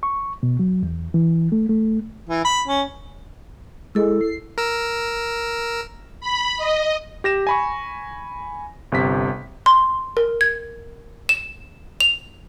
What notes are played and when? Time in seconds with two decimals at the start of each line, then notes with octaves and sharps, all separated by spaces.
0.03 C#6
0.43 B2
0.59 F#3
0.83 E2
1.14 E3
1.52 A3
1.69 A3
2.29 E3
2.45 B5
2.68 C#4
3.95 G#3 E4 A4
4.21 C7
4.58 A#4 E6
6.21 B5
6.57 D#5
7.24 G4 A#6 E7
7.47 G#5 B5 C#6
8.92 G1 C3 B6
9.66 C6
10.17 A#4
10.41 G#6
11.29 E7
12.00 F7